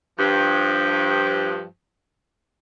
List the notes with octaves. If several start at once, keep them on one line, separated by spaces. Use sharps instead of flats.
G2 F3